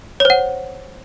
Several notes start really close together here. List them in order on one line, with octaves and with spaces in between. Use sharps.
C#5 C5 F#5